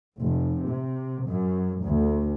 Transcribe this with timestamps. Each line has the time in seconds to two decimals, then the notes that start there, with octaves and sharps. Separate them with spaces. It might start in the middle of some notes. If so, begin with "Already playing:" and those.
0.18 F1
0.62 C3
1.26 F#2
1.81 D2